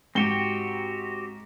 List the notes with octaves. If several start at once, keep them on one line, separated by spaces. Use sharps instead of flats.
G#2 C4 F#4 G4 G7